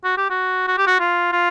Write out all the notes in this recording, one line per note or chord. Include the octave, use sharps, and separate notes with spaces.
F#4
G4
F#4
F#4
G4
F#4
F4
F4